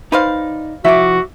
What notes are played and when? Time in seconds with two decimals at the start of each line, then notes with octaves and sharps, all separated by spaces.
0.12 D#4 B4 C5 D5 F5
0.84 C2 F3 E4 F#4 E5 D6